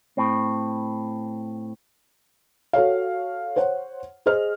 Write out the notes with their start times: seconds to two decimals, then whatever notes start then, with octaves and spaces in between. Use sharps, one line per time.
0.17 A2 C4
2.73 F#4 A4 C#5 F5
3.56 C5 C#5 F#5
4.26 G#4 C5 D#5 F6